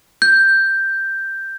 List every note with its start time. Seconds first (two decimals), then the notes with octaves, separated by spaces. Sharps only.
0.22 G6